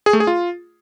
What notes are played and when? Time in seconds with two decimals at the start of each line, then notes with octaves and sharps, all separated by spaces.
0.06 G#4
0.13 A3
0.20 G#4
0.27 F4